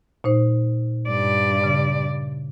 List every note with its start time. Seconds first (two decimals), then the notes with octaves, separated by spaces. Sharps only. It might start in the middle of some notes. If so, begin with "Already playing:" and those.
0.24 A#2 D#4 C5
1.08 G2 D5
1.64 C#3